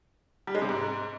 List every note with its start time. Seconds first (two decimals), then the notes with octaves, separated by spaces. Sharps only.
0.47 G3
0.55 G#3
0.62 C3
0.69 G#2